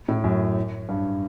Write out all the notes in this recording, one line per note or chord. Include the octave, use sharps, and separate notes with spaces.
A2
F#2
G2